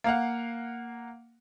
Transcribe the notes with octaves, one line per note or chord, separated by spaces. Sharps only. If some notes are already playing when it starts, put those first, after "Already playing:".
A#3 F5 F#5